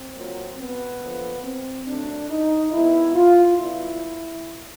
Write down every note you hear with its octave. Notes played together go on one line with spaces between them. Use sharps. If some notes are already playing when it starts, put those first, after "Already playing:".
Already playing: C4
A#2 F#3 A#3
B3
D3 F3 A#3
C4
D3 F#3 A3 D4
D#4
D#3 G#3 B3 E4
F4
D3 G3 B3 E4